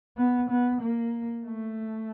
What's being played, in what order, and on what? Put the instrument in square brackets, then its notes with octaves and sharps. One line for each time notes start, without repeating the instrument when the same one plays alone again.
[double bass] B3
B3
A#3
A3